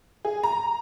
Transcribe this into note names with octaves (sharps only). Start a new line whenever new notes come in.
G#4
A#5